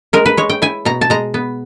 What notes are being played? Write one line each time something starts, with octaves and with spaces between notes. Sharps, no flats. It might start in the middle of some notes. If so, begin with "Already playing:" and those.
G#3 A#4
B4
G#3 C#5
G5
E4 G#5
B2 A#5
A5
G#3 A#5
B3